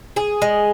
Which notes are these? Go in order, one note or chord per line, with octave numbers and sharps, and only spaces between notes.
G#4
G#3